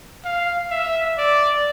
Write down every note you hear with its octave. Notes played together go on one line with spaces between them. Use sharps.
F5
E5
D5